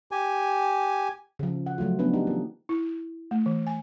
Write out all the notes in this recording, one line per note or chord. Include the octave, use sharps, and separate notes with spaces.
G4 G#5
C#3 F3
F#5
F3 F#3 A3 F4
F3 F#3 B3 C#4 D4 B4
D#4 G4
E3 A#3
E4
A3
E3
G#5